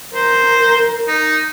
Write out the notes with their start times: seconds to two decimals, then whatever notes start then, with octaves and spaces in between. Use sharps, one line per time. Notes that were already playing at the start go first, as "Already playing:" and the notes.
0.14 A#4 C5
1.07 D#4